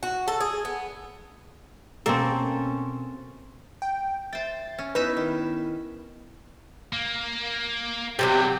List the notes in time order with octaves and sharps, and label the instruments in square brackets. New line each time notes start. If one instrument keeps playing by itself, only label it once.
[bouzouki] F#4
A4
G#4
B3
[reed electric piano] B2 [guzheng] A#3 [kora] C4 A4 [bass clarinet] C#4
[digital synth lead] G5
[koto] C5 G5 [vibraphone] E5 [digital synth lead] A6
[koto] C#4
[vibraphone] B3 E4 [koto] D#4 E5 [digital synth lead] B4
[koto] D#3
[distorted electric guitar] A#3
[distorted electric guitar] B1 G3 [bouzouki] C3 D#3 F#3 [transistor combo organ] G4